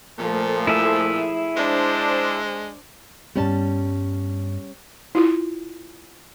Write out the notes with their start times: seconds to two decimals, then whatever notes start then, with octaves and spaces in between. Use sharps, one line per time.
0.19 A#2 F3 A3
0.67 E4 G#4 E5
1.57 G#3 D4 C5
3.35 G2 G3 B3 C#4 A5
5.15 E4 F4